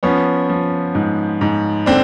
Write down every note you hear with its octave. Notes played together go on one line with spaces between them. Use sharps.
F3 B3 C#4
F3
G#2
G#2
D3 C4 D4